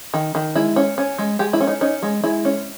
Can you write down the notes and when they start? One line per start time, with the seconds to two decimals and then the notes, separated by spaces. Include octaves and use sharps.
0.14 D#3
0.35 D#3
0.56 G#3 E4
0.76 C#4
0.98 C#4
1.19 G#3
1.39 G#3 G4
1.53 E4
1.61 C#4
1.67 D#4
1.81 C#4 D#4
2.03 G#3
2.24 G#3 E4
2.45 C#4